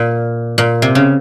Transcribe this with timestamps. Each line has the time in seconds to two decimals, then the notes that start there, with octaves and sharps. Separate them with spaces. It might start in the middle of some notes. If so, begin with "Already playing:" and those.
Already playing: A#2
0.58 A#2
0.82 C3
0.95 C#3